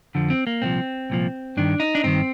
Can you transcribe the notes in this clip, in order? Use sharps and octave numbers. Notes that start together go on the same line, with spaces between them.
F2 D3 F3
C4
A#3
C2 A#2 F3 C4
C2 A#2 F3
G2 D#3 D4
D#4
D4
G2 D#3 C4